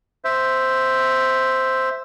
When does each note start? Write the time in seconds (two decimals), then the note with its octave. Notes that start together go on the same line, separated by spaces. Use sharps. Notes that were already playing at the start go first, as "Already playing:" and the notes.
0.25 C5 E5